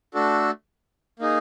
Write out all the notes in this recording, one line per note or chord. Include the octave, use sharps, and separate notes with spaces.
A3 D4 F#4 A4
A#3 D#4 G#4